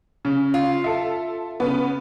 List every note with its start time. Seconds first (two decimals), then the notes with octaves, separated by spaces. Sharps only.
0.25 C#3
0.54 F4
0.84 A4 E5
1.60 C#3 B3